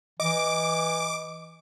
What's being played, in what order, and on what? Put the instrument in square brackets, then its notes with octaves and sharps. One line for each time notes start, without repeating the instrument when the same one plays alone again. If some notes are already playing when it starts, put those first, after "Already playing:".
[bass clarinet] E3 [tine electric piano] D#5 [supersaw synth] D6